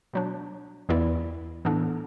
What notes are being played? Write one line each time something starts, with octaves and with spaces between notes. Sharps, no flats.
B2 F#3 D4
E2 E3 B3 E4 D5
A2 E3 B3 D4 A4